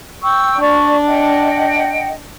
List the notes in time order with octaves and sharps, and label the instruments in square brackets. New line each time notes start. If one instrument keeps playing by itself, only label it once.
[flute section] G5 C#6 E6
[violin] D4 [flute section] D5 C#6
[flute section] D#5 F#5 G5